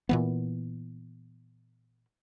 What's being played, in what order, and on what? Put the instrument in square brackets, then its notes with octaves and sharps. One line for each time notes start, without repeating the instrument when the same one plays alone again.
[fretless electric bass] A#2 E3 B3